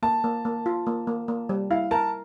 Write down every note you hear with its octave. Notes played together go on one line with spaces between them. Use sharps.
A#3 A5
A#3
A#3
F4
A#3
A#3
A#3
G3
E4 F5
A#4 A5